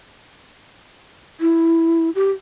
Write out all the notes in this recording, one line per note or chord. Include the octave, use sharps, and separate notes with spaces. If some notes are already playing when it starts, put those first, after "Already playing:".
E4
G4